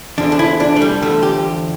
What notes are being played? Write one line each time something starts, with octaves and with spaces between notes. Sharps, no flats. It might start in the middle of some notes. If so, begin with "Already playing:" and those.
E2 D3 F3 D4
D4
E4
D4
A3
G3
E2 D3 F3 A3
G4